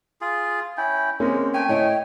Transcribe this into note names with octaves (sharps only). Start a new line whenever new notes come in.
F4 G#4
C#4 E4 G5
G#3 A#3 C4 C#4
A3 G5 G#5
A2 C#5 D#5 G5